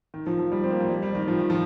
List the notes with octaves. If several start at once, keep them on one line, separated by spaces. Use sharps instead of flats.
D#3
F3
F3
G3
C4
A#3
F3
G3
G3
D#3
F3
D#3
F3